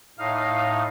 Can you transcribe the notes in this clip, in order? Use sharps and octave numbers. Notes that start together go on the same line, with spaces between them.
A2 D#4 F5